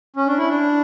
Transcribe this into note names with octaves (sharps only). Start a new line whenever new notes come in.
C#4
D4
E4
D4